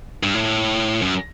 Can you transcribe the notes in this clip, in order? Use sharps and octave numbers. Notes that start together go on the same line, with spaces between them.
G2
A2
F#2